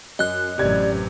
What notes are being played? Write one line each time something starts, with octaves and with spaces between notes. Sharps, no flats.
F#2 D#5 F#6
A1 F#2 C3 E3 D5 G#6